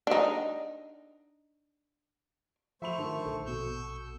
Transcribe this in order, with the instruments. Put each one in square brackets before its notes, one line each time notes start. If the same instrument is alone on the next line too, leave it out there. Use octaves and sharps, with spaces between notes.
[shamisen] D4 D#4
[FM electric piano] F3 [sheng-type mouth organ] A3 C5 C#6 [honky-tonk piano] E5 B5 F7
[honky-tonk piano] D3 D#3
[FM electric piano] A#1 A4
[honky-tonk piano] B2 [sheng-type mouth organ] C#6 E6 G6